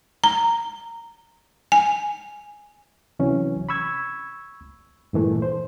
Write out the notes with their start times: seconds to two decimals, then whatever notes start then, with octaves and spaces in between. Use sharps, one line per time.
0.24 A#5
1.72 G#5
3.19 C3 E3 F#3 C#4
3.69 B5 C#6 E6 G#6
5.13 G2 A#2 E3 A3
5.42 C5